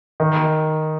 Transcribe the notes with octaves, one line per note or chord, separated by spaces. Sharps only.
D#3